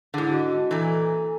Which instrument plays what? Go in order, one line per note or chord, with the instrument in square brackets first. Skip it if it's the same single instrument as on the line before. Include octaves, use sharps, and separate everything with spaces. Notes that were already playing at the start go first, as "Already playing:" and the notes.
[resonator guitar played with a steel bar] G#2 D3 [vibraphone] E4 G#4
[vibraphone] F#4 D#5
[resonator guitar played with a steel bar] A#2 E3 [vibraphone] A4 G#5 A#5